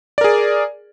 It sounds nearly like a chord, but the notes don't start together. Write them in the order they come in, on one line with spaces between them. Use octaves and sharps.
D5 A#4 G#4